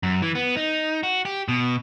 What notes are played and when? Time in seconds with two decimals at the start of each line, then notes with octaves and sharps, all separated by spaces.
0.03 F#2
0.22 E3
0.35 B3
0.57 D#4
1.03 F#4
1.25 G4
1.48 B2